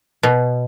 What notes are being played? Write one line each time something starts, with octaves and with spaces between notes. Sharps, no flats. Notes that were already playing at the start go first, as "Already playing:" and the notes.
B2